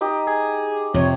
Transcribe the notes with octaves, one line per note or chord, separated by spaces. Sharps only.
D#4 G4 D#5
G#4
F2 C3 F3 C#5